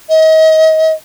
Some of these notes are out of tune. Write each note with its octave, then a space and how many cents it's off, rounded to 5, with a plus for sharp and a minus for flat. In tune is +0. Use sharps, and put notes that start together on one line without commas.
D#5 +35